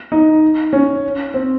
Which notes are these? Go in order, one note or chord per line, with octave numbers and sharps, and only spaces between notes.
D#4
C#4
C4